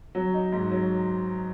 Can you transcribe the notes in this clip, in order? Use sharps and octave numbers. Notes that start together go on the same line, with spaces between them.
F#3
D#4
G#2
F#3